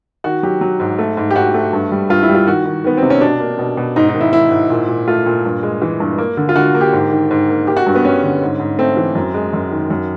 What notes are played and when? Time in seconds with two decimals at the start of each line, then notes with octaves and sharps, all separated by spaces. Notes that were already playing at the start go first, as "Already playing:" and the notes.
0.24 D#3 F#4
0.43 F#3 G4
0.61 F#3
0.80 G#2
0.99 A3
1.17 G#2
1.31 G4
1.36 G#2 F#4
1.54 A3
1.73 G2
1.92 G3
2.10 G2 F4
2.23 E4
2.29 G3
2.35 F4
2.47 D#3 F#4
2.65 D#3
2.84 D#3 B3
2.98 C4
3.03 C3
3.10 C#4
3.21 B2 D4
3.40 A#3
3.59 B2
3.77 B2
3.96 G#2 D#4
4.08 D#4
4.14 D#3
4.20 E4
4.33 D#3 E4
4.52 G#2
4.70 A#2
4.88 A#2
5.07 A3 F4
5.26 A#2
5.45 G2
5.63 G#3
5.82 E3
6.00 G2
6.18 A#3
6.37 D3
6.49 F4
6.56 D3 F#4
6.75 A#3
6.81 G4
6.93 G#2
7.12 D#3
7.31 G#2
7.48 A#3
7.67 A#3 G4
7.77 F#4
7.86 G2
7.95 B3
8.05 G3 C#4
8.23 D3
8.42 G#2
8.60 G#2
8.79 A3 C4
8.97 E3
9.15 F#2
9.34 G#3
9.53 F#2
9.71 D#3
9.90 F#2